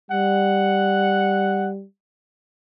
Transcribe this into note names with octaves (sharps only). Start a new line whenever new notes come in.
G3 F#5